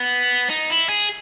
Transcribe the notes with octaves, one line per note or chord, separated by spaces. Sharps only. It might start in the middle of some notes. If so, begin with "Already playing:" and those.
Already playing: B3
D#4
E4
G#4